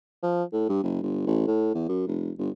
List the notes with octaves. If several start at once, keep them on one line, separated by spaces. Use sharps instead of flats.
F3
A2
G2
F#1
G1
A1
A2
E2
F#2
F1
G1